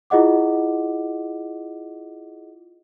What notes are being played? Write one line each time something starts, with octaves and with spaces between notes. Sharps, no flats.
E4 F4 G#4 D#5 F#5 D6